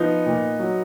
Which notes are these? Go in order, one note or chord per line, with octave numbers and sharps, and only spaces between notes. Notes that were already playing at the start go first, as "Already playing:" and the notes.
Already playing: F3 B3 D#4
A#2
F#3